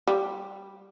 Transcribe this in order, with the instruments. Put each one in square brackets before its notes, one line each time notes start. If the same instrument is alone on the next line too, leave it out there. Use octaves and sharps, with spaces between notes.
[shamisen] G3